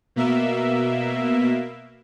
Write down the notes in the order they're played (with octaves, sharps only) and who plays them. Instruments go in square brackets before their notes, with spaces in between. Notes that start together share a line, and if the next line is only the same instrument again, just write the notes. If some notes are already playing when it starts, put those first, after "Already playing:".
[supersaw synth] B2 A#3 E5